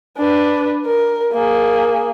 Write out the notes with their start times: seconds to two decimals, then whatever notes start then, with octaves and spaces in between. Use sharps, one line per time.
0.18 D4 B4
0.86 A#4
1.33 A#3 G#4